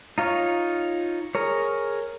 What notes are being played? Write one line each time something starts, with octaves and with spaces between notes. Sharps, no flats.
D#4 F4 C#5 F5 C#6
G#4 A#4 C#5